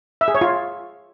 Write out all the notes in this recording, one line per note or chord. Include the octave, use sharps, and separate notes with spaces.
E5
G#4
C#5
F4